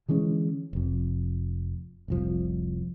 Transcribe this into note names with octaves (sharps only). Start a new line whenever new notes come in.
D3 E3 G#3 C#4
F1 F2
F1 C2 F3